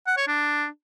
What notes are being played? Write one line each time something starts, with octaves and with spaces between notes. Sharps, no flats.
F#5
C#5
D4